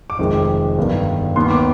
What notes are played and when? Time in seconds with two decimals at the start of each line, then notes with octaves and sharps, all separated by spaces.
0.10 D6
0.19 F1 F2 D#3 G#3 C4
0.78 G1 G2 D#3
1.36 D#2 D#3 B3 C6
1.51 D6